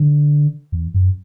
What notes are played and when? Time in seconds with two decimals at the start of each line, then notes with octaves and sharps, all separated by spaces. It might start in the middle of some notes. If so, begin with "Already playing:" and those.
Already playing: D3
0.72 E2
0.94 F#2